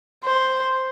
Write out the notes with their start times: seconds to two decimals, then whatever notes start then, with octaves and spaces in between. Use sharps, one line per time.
0.24 C5